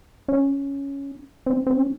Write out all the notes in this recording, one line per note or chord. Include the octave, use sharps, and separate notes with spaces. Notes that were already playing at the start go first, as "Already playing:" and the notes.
C#4
C4
C4
C#4